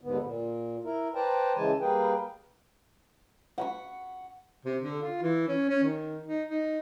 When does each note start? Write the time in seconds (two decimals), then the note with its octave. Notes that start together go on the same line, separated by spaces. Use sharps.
0.01 D#2 G#2 D3 B3
0.23 A#2
0.84 E4 A#4
1.15 B4 C5 D5 G5 A5 A#5
1.56 C#3 E3 G#3 G#5 A5
1.81 G3 A#3 G#4 B4 G5
3.58 F#5 B5 C#6
4.65 C3
4.81 D3
5.02 F4
5.22 E3
5.48 C#4
5.69 C#4
5.83 D#3
6.26 D#4
6.48 D#4